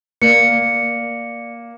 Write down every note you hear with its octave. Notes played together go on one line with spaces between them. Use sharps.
A#3 D5 C#7